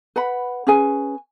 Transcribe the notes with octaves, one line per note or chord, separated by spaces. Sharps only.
B4 F#5 B5
C#4 G#4 B4 G#5